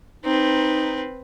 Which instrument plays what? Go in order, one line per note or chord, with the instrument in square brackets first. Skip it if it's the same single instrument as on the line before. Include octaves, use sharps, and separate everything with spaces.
[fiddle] C4 B4 [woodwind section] D#4